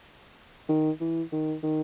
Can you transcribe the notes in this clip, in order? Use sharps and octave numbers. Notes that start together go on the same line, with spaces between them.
D#3
E3
D#3
D#3